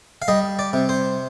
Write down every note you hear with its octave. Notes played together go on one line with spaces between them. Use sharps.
F5
G3 D#5
D5
C3
C5